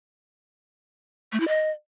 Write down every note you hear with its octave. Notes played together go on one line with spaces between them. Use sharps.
A3
E4
D#5